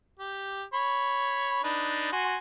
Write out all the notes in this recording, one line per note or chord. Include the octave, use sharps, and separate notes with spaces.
G4
C#5 B5
D4 D#4 B4
F#4 G#5 C6